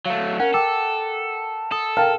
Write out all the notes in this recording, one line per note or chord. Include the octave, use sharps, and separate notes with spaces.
F#3 A3 F5
C#4 A#4 F#5
A4 G5 D6 E6
A4 D#6
A#4 F5 G5 A5 F6